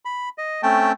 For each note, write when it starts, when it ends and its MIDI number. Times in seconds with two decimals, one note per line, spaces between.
0.05 0.29 83
0.38 0.61 75
0.63 0.92 57
0.63 0.92 60
0.63 0.92 61
0.63 0.92 79
0.63 0.92 81